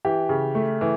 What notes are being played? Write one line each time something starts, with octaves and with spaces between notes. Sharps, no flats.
E3 G4
C#3
A3
E3